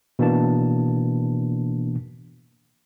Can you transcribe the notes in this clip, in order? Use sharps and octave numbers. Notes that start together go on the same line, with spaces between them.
B2 E3 A#3 D4 A5